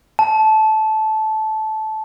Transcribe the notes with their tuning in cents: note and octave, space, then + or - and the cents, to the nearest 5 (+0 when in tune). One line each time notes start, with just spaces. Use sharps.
A5 -15